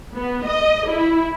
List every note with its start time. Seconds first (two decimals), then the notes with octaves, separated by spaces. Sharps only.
0.14 B3
0.47 D#5
0.89 E4